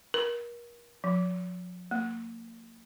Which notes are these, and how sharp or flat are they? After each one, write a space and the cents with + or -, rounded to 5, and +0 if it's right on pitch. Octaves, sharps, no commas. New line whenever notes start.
A#4 +35
F3 +45
A#3 -30